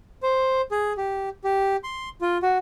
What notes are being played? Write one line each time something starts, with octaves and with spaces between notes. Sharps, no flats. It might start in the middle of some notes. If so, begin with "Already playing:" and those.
C5
G#4
G4
G4
C6
F4
F#4